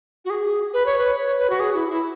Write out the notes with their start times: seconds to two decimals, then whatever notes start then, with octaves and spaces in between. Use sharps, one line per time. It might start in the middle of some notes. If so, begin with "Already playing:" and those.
0.25 F#4
0.30 G#4
0.73 B4
0.86 C#5
0.98 B4
1.17 C#5
1.38 B4
1.50 F#4
1.60 G#4
1.74 E4
1.89 E4